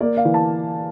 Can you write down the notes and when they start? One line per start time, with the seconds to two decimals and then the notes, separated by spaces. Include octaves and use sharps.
0.01 A#3 D5
0.17 F5
0.25 E3
0.34 A5